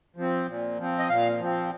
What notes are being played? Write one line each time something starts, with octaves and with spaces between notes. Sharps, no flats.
F3 C4
A#2
F3 C4
D#5
A#2 F5
F3 C4